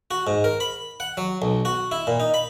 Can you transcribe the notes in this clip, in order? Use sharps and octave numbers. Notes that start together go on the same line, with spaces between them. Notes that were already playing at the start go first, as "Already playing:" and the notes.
F#4
G#2
A#4
B5
F#5
F#3
B1
F#4
E4
A#2
D#4
B5